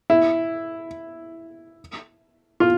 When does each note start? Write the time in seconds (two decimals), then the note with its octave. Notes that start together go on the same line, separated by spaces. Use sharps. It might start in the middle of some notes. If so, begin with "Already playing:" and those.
0.10 E4
2.60 F4